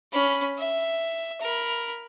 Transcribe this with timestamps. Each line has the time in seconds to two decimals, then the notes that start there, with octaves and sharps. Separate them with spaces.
0.12 C#4 B5
0.58 E5
1.41 A#4 B5